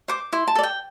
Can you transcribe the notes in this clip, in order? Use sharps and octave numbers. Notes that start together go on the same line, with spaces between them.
C5 D6
E4 C6
A5
A4 D5
G5